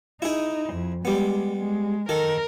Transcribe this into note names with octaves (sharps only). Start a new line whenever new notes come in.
D#4 E4 G#4
F2
G3 G#3 B3
G#3
D#3 A4 A#4